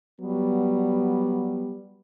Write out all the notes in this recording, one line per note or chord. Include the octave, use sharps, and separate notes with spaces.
F#3 G3 B3